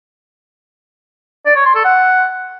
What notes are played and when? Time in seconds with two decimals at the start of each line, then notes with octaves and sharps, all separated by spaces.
1.46 D5
1.55 C#5
1.65 C6
1.75 A4
1.85 F#5